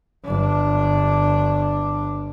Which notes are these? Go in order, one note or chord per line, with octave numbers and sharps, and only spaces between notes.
G1 D4